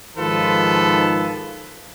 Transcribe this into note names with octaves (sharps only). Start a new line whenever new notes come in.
G#2 D#3 F3 F4 A4 B4